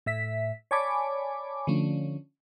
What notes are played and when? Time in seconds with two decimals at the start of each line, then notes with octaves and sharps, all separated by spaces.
0.06 A2 E5 B6
0.71 C#5 D5 G#5 A5 B5 D6
1.67 D3 F3 A3 C#4